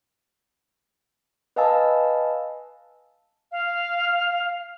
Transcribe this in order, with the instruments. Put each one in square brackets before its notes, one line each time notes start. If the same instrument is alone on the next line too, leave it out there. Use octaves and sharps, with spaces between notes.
[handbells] B4 D#5 F5 G#5 A5 E6
[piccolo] F5